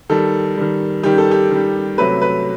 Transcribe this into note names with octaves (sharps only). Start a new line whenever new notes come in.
D#3 G3 A4
D#3 G3
D#3 G3 G4
A4
G4
D#3 G3
C3 F#3 A3 B4
B4